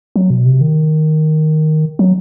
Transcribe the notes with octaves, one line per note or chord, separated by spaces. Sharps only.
F#3
B2
C3
D#3
F#3